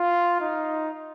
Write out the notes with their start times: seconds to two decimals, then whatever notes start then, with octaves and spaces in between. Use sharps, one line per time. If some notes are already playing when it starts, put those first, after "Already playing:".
Already playing: F4
0.41 D#4